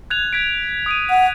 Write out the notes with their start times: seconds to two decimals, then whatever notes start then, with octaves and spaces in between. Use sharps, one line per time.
0.10 F#6 G#6 F7
0.33 G#6 B6 D7
0.86 D#6 D7 D#7
1.10 F#5